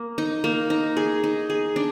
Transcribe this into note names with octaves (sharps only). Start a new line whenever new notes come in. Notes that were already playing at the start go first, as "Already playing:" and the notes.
Already playing: A#3
D#4
A#3
D#4
G#4
D#4
G#4
D4